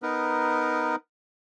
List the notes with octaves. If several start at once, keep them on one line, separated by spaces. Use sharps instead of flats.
B3 D#4 A#4 B4